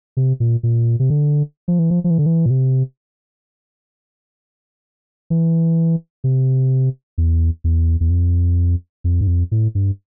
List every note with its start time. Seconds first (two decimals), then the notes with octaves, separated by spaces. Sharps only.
0.17 C3
0.40 A#2
0.63 A#2
1.00 C3
1.10 D3
1.68 F3
1.79 E3
1.90 F3
2.04 F3
2.10 E3
2.18 D3
2.26 E3
2.46 A#2
2.50 C3
5.30 E3
6.24 C3
7.18 E2
7.64 E2
8.00 E2
8.10 F2
9.04 F2
9.21 G2
9.27 F2
9.51 A2
9.75 G2